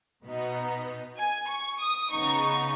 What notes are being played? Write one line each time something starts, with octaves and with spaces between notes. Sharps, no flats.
B2 B3 D#4
G#5
C#6
D#6
C#3 B3 D#4 C#6